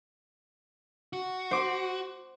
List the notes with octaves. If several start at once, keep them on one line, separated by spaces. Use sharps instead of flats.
F#4
C5 D6